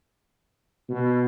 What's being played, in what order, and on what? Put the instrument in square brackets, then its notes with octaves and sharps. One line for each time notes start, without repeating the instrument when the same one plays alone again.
[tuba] B2